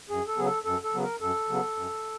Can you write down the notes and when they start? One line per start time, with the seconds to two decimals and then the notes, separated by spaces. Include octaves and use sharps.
0.10 F#2 G#4
0.27 A4
0.37 C#3 F#3 B3 G#4
0.46 A4
0.65 F#2 A4
0.84 A4
0.94 C#3 F#3 B3
1.03 A#4
1.21 F#2 A4
1.49 C#3 F#3 B3
1.77 F#2